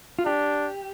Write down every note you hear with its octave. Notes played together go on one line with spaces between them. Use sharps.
F4
D4 G4